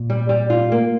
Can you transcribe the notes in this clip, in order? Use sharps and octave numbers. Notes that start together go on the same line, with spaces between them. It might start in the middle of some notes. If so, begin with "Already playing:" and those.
Already playing: A#2
G3
G3
F4
A#3